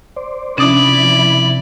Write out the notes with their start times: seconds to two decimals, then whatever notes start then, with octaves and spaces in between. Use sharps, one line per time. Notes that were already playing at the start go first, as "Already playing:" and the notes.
0.16 C5 D5
0.58 C3 F3 C#4 D4 E4 D5 D#6